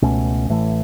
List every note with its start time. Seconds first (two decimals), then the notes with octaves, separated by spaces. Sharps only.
0.02 C#2 B2 A3 C#4
0.48 A1 A2 E3 A3